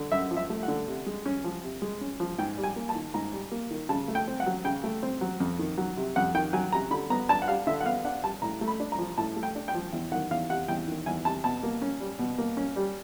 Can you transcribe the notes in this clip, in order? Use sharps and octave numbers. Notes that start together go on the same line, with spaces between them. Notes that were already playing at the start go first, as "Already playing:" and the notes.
Already playing: D3
F#2 E5
F3
E5
A3
F#5
D3
C3
G#3
C#4
F3
C3
G#3
C#4
F3
G#2 G5
G3
G#5
A#3
A5
D#3
G#2 A#5
G3
A#3
D#3
C#3 A5
A3
G5
C4
F#5
F#3
C#3 G5
A3
C4
F#3
F2
D#3
F#3
C3
F2 F#5
D#3 G5
F#3 G#5
C3 A#5
D3 B5
B3 A#5
D4 A5
F#5
G3 F5
D3 E5
F#5
B3 F5
D4 F#5
G3 A5
A2 A#5
A3
B5
D4
A#5
F3
A2 A5
A3
G5
D4
G5
F3
E2
D#3 F#5
E2 F5
C3 F#5
E2 G5
D#3
E2 G#5
C3 A5
B2 A5
A#3
C#4
G3
B2
A#3
C#4
G3